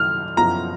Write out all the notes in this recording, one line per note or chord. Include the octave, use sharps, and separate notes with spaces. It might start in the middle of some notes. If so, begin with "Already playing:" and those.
Already playing: F#2 D#3 F#3 F6
F#2 F3 B3 F4 A#5